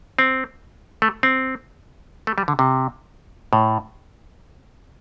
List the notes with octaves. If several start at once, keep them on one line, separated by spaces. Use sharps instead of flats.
C4
A3
C4
A3
G3
D3
C3
A2